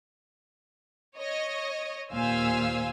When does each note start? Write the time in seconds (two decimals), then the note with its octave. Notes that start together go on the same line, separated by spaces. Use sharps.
1.17 C#5 D#5
2.12 D#2 A#2 C5 F5 G#5 E6